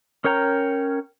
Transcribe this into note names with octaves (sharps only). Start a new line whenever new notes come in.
C#4 A#4 C#5 G5 A#5